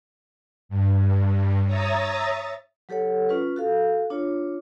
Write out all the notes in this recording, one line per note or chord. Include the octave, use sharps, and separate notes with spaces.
G2
C#5 E5 A#5 D#6 A6
F#3 G4 A4 C#5 F#5
C#4 F4 B4
F#4 A4 F5
D4 F4 C#5